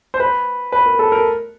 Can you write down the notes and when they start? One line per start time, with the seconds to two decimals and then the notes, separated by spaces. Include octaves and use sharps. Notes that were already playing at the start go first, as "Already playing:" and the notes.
0.14 C5
0.20 B4
0.72 B4
0.86 A#4
0.99 A4
1.12 A#4